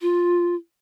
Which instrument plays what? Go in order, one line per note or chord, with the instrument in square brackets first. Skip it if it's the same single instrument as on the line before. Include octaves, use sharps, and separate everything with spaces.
[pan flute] F4